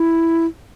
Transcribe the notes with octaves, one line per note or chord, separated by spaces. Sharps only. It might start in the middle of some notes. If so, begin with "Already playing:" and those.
Already playing: E4